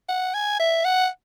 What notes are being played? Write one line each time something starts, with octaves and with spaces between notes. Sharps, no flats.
F#5
G#5
E5
F#5